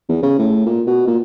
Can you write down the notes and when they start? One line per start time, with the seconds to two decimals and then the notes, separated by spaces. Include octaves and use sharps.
0.09 E2
0.23 C#3
0.39 A2
0.66 A#2
0.87 B2
1.07 A#2